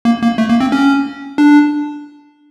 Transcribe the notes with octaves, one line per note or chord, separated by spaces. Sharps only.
A#3
A#3
A3
A#3
C4
C#4
D4